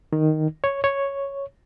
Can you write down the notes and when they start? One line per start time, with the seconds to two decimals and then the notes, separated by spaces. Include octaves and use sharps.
0.13 D#3
0.64 C#5
0.84 C#5